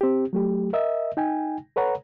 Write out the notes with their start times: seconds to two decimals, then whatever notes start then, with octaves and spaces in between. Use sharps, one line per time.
0.01 C4 G4
0.33 F#3 A3 G4
0.73 A#4 D#5 E5
1.17 D#4 G5 G#5
1.76 A4 B4 C#5 F#5 A#5